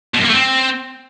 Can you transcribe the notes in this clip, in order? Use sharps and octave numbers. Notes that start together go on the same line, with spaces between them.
B2
F#2
A#3
A3
C4